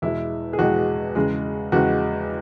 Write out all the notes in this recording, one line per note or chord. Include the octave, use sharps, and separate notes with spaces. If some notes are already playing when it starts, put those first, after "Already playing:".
E2 B2 G#3 E4
G#4
E2 B2 G#3 F#4
E2 C#3 G#3
E2 C#3 G#3 F#4